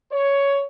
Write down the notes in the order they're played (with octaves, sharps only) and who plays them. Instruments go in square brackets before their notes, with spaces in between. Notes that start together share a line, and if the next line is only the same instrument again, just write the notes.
[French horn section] C#5